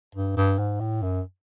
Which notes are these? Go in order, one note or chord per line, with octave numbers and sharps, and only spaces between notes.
G2
G2
G#2
A2
F#2